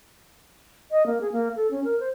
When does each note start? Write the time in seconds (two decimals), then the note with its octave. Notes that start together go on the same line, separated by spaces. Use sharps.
0.91 D#5
1.06 A#3
1.21 G#4
1.32 A#3
1.56 A4
1.71 C#4
1.84 A#4
2.00 C5